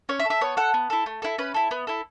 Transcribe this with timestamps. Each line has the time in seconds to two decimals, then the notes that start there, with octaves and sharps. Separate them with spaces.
0.09 C#4 C#5
0.20 E5
0.25 A4
0.30 E5
0.41 B3 C#5
0.57 A4 F#5
0.74 B3
0.90 E4 A4
1.06 A3
1.22 E4 A4
1.38 C#4 B4
1.54 E4 A4
1.71 B3
1.87 E4 A4